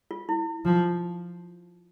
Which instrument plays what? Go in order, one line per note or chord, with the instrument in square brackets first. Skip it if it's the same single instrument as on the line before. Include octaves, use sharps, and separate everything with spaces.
[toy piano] F4
E4
[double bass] F3